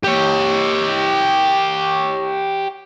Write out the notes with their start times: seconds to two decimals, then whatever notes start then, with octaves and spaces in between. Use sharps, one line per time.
0.04 G4 C#5